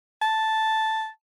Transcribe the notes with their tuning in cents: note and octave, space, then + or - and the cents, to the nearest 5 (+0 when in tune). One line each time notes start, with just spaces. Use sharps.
A5 +0